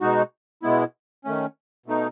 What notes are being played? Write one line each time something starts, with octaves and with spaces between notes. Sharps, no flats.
B2 G#3 D#4 F#4
B2 G#3 B3 E4
D#3 A3 C#4
B2 A3 D#4